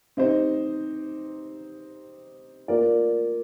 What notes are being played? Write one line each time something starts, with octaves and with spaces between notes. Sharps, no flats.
C4 D#4 G4 C5 D#5
A#3 F4 A#4 D5